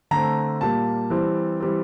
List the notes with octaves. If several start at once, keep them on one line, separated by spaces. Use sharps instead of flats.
D3 A3 C4 A#5
A#2 G3 A#3 A5
E3 G3 C4
E3 G3 C4